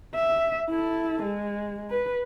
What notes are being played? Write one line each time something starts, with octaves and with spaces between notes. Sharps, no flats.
E5
E4 A4
G#3
B4